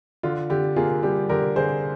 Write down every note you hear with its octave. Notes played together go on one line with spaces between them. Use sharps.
D3 F4
D3 G4
A#3 F4 G#4
G3 G4
D3 G4 A#4
D3 G#4 C5